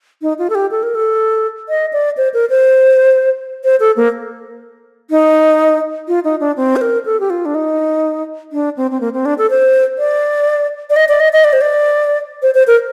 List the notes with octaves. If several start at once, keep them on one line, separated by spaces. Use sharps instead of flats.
D#4
F4
A4
G4
A4
A#4
A4
D#5
D5
C5
A#4
C5
C5
A4
A#3
D#4
F4
D#4
D4
C4
C5
A#4
A4
G4
F4
D4
D#4
D4
C4
C4
A#3
C4
D4
A4
C5
D5
D5
D#5
D5
D#5
D#5
D5
C5
D5
C5
C5
A#4